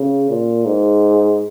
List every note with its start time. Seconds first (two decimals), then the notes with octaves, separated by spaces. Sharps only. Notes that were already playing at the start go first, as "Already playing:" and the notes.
Already playing: C#3
0.29 A#2
0.66 G#2